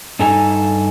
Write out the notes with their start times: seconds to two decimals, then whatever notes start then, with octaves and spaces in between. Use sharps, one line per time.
0.19 G2 D#4 A4 G#5 A#5